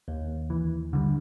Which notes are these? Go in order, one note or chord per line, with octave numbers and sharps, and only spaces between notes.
D#2
E3
D3 F3 G3